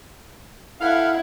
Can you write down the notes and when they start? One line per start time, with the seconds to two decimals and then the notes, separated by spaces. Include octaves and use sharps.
0.81 E4 A4 B4 F5 F#5 G#5